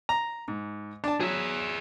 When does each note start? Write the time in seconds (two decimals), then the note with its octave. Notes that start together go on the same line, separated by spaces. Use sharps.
0.09 A#5
0.48 G#2
1.04 D4 A5
1.20 F#3 G#4 E5